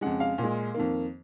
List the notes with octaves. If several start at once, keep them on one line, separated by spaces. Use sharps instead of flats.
F2 C#3 G#3 F#5
F5
A#2 G#3
F2 D#3 A#3